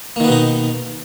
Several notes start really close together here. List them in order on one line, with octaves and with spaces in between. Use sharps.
A#3 D#3 B3 B2 D#4